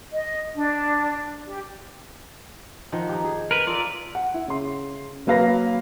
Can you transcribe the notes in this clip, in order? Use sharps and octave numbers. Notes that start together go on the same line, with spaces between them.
D#5
D4
G4
D#3 F3 F#5
D#4 G4
G#4
A#4 B4
F4 A4 A#4 D5
F#5
E4
C#3 C6
F#3 A#3 B4 F5 B5 A#6